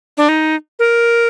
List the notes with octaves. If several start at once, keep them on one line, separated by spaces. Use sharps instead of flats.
D4
D#4
A#4